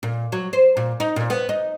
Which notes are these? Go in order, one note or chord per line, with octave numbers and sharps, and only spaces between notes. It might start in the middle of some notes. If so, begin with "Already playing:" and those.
A#2
F#3
C5
A#2
D#4
A#2
B3
D#4